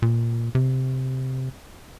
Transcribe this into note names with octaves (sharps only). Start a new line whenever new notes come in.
A#2
C3